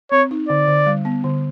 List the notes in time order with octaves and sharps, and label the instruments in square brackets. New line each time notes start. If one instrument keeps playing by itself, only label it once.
[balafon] C4 [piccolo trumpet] C#5
[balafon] D#4
[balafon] D3 [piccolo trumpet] D5
[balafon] D3
G3
B3
D3